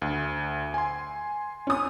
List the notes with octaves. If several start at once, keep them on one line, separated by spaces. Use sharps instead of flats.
D2
G#5 C6
C#4 D#6